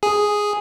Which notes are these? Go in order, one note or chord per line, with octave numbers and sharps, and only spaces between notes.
G#4